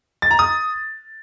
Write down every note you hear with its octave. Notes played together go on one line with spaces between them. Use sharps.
A6
A#5
D#6